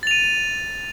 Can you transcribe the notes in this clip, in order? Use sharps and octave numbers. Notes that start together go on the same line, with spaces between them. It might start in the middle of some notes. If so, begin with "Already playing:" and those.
A6 D#7 F7